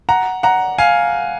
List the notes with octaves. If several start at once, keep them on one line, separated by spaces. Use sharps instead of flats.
F#5 A#5
F#5 A#5
F5 G#5